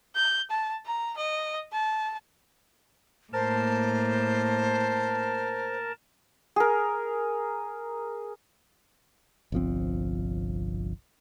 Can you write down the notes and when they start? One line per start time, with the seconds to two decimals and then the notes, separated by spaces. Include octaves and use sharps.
0.15 G6
0.50 A5
0.86 A#5
1.17 D#5
1.72 A5
3.33 A2 A#3 A#4 C5 A5
6.56 G#4 A#4
9.52 G1 C2 F3 C4